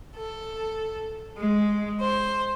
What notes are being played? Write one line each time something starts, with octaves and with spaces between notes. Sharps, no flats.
A4
G#3
C5